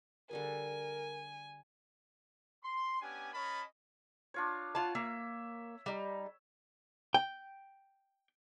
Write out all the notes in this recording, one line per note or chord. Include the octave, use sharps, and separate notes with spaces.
D3 G3 G#4 A#4 G#5
C6
B3 C#4 D4 G4 G#5
C#4 A#4 C#5 D#5 A5 B5
D4 F4 C#5
F4 C#5 F#5 A5
A#3 E5
G3 D#4
G5